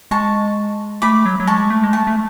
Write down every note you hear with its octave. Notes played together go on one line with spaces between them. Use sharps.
G#3 A5 C#6
A3 B5 D6
F#3
F#3
G#3 A5 C#6
A3
G#3
A3 A5 C#6
A3